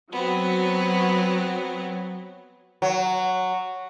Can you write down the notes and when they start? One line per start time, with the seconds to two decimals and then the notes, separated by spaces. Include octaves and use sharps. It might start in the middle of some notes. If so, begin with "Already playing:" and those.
0.12 F#3 B3 C4
2.82 F#3